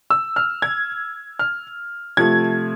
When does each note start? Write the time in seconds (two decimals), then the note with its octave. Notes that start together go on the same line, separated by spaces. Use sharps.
0.10 E6
0.36 F6
0.62 G#6
1.39 F6
2.17 C3 F3 A3 G#6